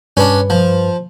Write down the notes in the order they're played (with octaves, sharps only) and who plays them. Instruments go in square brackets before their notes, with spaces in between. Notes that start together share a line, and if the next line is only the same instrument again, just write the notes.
[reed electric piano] G2 B4 [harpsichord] C#4 D4
[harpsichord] F3